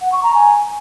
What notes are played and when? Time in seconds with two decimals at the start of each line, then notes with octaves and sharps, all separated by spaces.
0.01 F#5
0.12 C#6
0.23 A#5
0.34 G#5